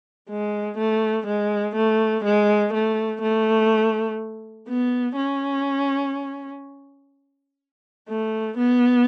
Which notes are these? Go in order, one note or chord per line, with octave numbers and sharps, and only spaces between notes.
G#3
A3
G#3
A3
G#3
A3
A3
B3
C#4
A3
B3